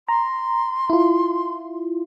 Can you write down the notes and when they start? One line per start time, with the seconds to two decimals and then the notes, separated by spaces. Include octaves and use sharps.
0.09 A#5 C6
0.90 E4 F4